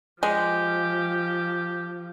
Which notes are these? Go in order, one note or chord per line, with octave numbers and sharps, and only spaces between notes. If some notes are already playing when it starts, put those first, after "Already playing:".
F3 G#3 G4